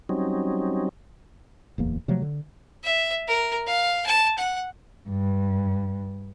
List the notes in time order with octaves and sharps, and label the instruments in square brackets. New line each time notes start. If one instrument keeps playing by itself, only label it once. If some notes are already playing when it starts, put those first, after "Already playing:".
[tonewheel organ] F#3 G3 C4 C#4 D#4
[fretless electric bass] D1 E2 A#3
C3 F3 F#3 A3
D3
[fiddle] E5
A#4
F5
A5
F#5
[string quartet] G2